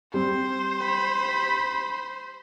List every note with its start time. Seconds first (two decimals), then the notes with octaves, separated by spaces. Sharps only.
0.14 G3 C4 C5
0.82 B5